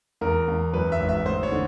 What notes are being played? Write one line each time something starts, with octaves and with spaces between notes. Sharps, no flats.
E2 A#4
E2
F#2 B4
E5
G#1
E5
D2 C5
C#5
D3